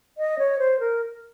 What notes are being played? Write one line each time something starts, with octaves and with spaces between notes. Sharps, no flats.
D#5
C#5
C5
A#4